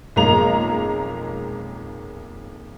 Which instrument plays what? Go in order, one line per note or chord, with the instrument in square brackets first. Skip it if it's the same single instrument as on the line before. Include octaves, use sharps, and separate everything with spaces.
[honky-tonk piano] B1 F2 G#3 A#3 A#5 F7